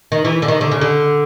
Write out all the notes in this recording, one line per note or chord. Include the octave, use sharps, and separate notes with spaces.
D#3
E3
D3
D#3
D3
C#3
D3